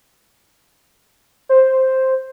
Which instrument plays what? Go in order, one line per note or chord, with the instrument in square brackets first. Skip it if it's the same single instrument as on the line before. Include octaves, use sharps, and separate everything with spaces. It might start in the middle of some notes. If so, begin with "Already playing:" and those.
[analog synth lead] C5